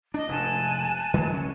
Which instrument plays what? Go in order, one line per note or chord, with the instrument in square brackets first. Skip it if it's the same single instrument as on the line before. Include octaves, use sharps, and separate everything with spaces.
[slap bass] D4 [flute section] D#5
[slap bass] F1 G#2 [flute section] G#5 A5 F#6
[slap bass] D#3 F#3 A3
C#2 F3 C#4